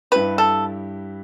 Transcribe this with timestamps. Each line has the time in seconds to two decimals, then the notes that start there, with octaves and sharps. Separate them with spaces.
0.12 G2 G3 E4 G4 B4
0.38 A4